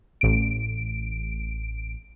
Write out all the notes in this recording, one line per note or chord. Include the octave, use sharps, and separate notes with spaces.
A1 D7